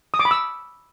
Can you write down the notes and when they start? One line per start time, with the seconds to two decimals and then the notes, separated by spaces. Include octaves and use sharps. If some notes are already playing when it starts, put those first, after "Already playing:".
0.14 D#6
0.19 D6
0.25 B5
0.31 E6